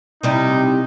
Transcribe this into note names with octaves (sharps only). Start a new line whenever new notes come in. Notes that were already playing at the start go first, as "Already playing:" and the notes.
C3 G3 D#4 E4